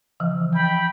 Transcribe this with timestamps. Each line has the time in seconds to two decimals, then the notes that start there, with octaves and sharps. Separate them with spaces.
0.20 C#3 E3 F3
0.55 G5 B5